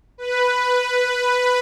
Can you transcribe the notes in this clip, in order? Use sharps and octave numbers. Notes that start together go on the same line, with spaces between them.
B4